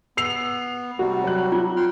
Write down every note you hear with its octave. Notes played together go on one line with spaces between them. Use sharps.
B3 E6 C7 F7
C3 G3 F#4
F#3 F#6
F4
G5 C6 F6